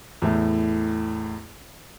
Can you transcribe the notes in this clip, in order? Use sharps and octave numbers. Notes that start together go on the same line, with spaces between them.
E2 A2 A3